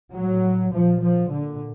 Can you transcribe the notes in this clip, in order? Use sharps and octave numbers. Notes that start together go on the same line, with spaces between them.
A2 F#3
A#2 F3
F3
A#2 D3